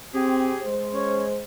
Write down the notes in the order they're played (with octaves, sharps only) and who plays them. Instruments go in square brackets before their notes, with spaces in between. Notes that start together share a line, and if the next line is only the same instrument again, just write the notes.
[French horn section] C4 [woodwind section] G4 G#4
[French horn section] G#3 C5
[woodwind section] C#4 C#5